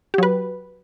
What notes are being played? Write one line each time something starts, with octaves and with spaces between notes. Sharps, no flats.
F#3 G4 B4